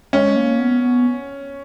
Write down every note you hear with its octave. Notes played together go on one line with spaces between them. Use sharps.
G#3 C#4
A#3
B3
B3